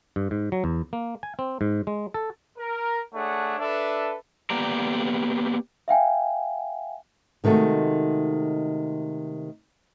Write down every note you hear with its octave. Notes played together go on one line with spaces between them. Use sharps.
G2
G#2
F#3
E2
A#3
G#5
C4
G#2
G#3
A4
A#4
A3 D4 G#4 C#5 F#5
D4 A4 B4 E5
A#3 B3 G4 D5 A#5
E5 F5 G5 G#5
C3 D#3 G#3 A3 F#4